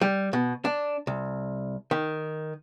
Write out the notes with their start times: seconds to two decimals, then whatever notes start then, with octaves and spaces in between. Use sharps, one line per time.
0.01 G3
0.33 B2
0.65 D4
1.07 C2
1.91 D#3